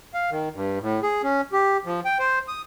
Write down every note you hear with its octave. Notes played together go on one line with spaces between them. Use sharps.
F5
D#3
G2
A2
G#4
C#4
G4
F3
G5
C5
D#6